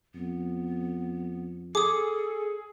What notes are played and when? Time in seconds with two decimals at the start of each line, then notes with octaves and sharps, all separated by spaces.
0.15 F2 B3
1.75 G#4 A4 D6 D#6